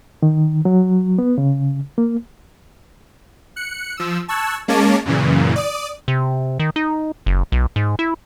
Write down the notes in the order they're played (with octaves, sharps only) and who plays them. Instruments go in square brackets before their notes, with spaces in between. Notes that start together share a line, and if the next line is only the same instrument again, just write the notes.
[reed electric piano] D#3
F#3
B3
C#3
A#3
[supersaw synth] F#6 C#7
F3 E6
A5 C#6 E6 F#6 G#6
G#3 A#3 C#4 C#5 A5 D6
F#2 A#2 C#3 E3
D5 D#6
[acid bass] C3
D#3
D#4
F#1
B1
G#2
E4